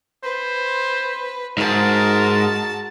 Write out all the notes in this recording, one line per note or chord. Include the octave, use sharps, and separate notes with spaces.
B4 C5
G#2 F#4 A#4 A5